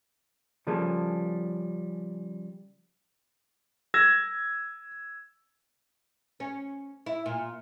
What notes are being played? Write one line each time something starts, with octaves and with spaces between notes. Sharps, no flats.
C#3 F3 G3 A#3 G#4 A4
E6 G#6 A#6 E7
C#4
E4
A#2